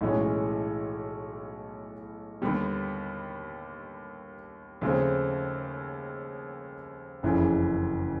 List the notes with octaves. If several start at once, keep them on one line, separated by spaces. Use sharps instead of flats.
B1 A2 E3 G#3 C#4
D#2 D3 G3 B3
D#2 C#3 F3 A3 C4
F#1 F2 C#3 E3